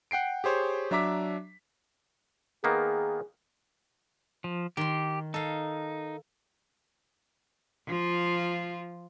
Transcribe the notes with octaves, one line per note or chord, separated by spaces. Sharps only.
F#5 G5 C7 D7
G4 G#4 C5 C#5
F#3 D4 E5 A#5 D6 B6
D#3 A#3 B3 G#4
F3
D#3 G4 C6
D#4 A4 F5
F3 F4